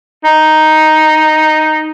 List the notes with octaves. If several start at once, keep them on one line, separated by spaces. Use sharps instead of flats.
D#4